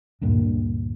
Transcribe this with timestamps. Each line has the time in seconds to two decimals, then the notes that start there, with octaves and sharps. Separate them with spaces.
0.21 D2 G2 A#2